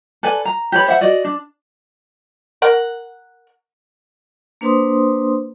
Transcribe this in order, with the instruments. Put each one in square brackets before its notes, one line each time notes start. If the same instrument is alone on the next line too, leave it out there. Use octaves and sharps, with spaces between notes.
[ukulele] A4 B4 D5 G#5
A#5
G4 B4 C#5 B5
C5 E5 F#5
F#4 D5 D#5
D4
[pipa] A#4 F#5
[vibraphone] A#3 D4 B4 C5 C6 D#6